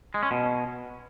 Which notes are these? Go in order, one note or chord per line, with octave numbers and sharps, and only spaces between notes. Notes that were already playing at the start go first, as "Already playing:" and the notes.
G#3
C#4
B2